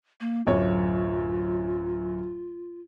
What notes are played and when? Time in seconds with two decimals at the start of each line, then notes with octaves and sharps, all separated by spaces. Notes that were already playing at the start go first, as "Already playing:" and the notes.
0.20 A#3
0.47 D1 F#2 F4 C#5